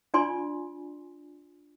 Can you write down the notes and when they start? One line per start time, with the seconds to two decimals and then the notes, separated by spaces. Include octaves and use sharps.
0.14 D4 F4 D5 G#5 C6